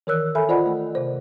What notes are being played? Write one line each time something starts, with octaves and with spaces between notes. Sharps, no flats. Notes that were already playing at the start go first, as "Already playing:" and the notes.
D#3 E3 A#4 C#5 E6 F#6
A4 E5 G#5 B5 F6
F4 C5 D5 D#5 F#5 B5
A3
C3 C5